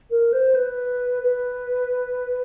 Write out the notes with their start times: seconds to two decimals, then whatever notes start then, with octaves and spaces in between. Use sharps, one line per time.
0.10 A#4
0.33 C5
0.55 B4
1.22 B4